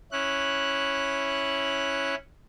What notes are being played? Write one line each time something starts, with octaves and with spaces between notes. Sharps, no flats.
C#4 E4 F#6